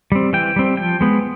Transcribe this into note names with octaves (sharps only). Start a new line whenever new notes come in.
G3 C4
E3 G5
G3 C4
F3 G5
G#3 B3